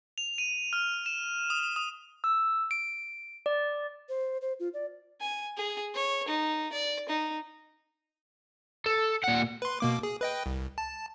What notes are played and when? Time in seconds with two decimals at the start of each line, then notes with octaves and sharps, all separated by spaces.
0.18 F7
0.38 D#7
0.73 F6
1.06 E7
1.50 D#6
1.76 D#6
2.24 E6
2.71 D7
3.46 D5
4.09 C5
4.42 C5
4.60 F4
4.74 D5
5.20 G#5
5.57 G#4
5.95 C#5
6.28 D#4
6.73 D5
7.09 D#4
8.86 A4
9.23 A#2 F#5
9.62 B4 C6
9.80 B2 A#3 D6
10.03 G#4
10.21 B4 D#5 G5
10.46 C2
10.78 A5